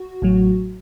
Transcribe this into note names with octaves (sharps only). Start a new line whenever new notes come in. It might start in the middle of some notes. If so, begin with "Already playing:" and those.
Already playing: F#4
A1 A2 F#3